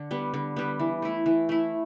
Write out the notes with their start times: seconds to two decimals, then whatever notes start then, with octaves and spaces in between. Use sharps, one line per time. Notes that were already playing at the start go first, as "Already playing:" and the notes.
Already playing: D3
0.11 G3 B3
0.34 D3
0.56 G3 B3
0.80 E3
1.02 A3 E4
1.26 E3
1.49 A3 E4